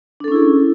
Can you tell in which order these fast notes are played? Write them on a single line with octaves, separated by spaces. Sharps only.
D4 A4 C#4 E4 G#4